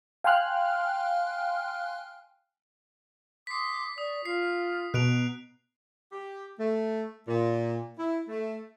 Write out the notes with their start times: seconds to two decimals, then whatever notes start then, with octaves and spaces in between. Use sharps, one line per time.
0.24 F5 G5 G#5 C6 F6 F#6
3.47 C6 D6 D#6 B6 C7
3.98 D5 C#6 D#6
4.25 F4 C7
4.94 B2 A#5 F#6 D7 F7
6.12 G4
6.58 A3
7.28 A#2
7.98 E4
8.28 A3